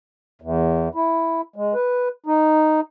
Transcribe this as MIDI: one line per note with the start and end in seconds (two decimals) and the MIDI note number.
0.42 0.88 40
0.95 1.41 64
1.56 1.74 56
1.74 2.09 71
2.26 2.80 63